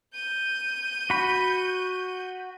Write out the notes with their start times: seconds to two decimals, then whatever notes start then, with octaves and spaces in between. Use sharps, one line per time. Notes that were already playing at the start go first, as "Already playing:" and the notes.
0.14 G6 D#7
1.10 F#4 B5